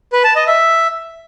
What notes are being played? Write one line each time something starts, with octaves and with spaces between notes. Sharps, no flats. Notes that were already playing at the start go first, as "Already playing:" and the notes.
B4
A5
D#5
E5